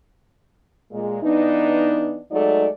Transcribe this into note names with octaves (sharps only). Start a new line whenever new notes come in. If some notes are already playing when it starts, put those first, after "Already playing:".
A#2 G#3
E3 B3 D4 D#4
F#3 G#3 A3 D#4 D5